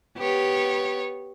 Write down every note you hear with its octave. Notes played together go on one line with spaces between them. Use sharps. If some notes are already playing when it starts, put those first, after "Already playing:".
B3 G4 C#5